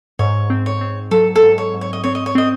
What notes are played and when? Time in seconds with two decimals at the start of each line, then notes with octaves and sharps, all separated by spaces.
0.19 G#2 C#5
0.50 C4
0.66 C#5
0.81 C4
1.11 F#3 A4
1.36 A4
1.43 G#2
1.58 C#5
1.74 G#2
1.81 C#5
1.93 D#5
2.04 C4 C#5
2.15 D#5
2.26 C#5
2.35 C4 D#5